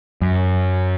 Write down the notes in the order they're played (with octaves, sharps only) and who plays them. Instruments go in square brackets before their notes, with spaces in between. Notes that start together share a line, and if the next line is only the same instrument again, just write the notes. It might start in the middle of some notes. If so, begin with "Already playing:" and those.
[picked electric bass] F#2